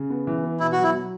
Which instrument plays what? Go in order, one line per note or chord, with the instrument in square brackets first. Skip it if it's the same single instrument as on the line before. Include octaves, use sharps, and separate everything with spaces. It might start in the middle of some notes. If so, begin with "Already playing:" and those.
Already playing: [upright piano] C#3
B3
E3
B3
[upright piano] B2 [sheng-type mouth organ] E4
[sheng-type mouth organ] F#4
[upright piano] F#3
[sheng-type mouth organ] E4
[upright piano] F#3